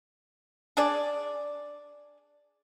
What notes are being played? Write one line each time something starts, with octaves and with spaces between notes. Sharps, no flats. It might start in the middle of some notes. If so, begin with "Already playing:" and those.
D4 G#4 D5